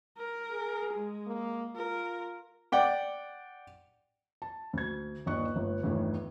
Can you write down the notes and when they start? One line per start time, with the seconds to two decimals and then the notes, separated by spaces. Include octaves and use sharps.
0.18 A#4
0.51 G#4
0.93 G#3
1.27 A#3
1.76 F4 A#4
2.72 D5 F#5 G5 D6
4.42 A5
4.73 D2 G#6
5.26 G1 D#2 D4 D#5 C#6 F#6
5.56 G1 A2
5.83 G1 E2 A2 D3 D#3